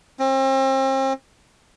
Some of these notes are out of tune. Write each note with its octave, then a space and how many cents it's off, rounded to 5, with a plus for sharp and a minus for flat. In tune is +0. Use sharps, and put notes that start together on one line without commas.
C4 +40